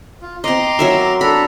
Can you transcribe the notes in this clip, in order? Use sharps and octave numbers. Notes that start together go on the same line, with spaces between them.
F4
C4 D#5 A#5 C6 D6
F#3 A#4 E5
D4 A4 A#5 B5